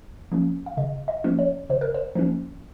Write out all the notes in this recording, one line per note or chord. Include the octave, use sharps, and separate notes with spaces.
F3 A#3 C#4
F5
C#3 D#5
D#5
F3 A#3 C#4
C#5
C#3 C5
A#4
C5
F3 A#3 C#4